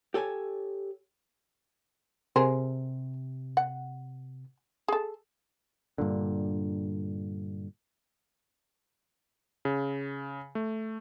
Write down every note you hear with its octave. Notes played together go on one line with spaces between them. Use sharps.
G4 A4 C#5 G#5
C3 G#4 A#4 C5
F#5
G#4 A4
G2 A#2 D3
C#3
A3